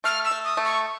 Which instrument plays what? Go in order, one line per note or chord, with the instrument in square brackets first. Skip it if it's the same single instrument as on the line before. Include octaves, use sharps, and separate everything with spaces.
[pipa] A3 [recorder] F6
[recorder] E6
[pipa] A3
[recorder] D#6
[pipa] A3
[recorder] C#6